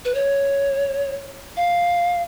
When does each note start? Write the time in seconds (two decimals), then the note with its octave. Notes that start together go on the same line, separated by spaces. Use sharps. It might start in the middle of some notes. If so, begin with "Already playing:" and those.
0.05 B4
0.15 C#5
1.57 F5